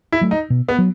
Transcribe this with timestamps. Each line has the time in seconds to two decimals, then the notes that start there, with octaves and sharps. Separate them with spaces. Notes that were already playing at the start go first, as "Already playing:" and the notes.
0.12 E4
0.21 F#3 A3
0.31 D#4
0.50 B2
0.68 B3
0.78 F#3